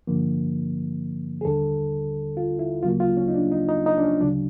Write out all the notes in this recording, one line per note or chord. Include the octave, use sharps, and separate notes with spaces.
G2 D3 F3 A#3
G#4
D#2 D3 G3 A4
F4
E4
D2 C#3 F#3 A#3 F4
F4
C#4
D#4
D4
D#4
D#4
D#4
D4
C#4
D2 C#3 F#3 D4